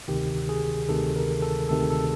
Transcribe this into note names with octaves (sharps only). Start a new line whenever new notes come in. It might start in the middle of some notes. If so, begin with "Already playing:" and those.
D2 C3 D#3 G4
G#4
D2 C3 D#3 A4
A#4
A4
D2 C3 D#3 A4
A4